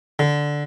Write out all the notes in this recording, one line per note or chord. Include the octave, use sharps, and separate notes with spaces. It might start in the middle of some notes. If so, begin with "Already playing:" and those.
D3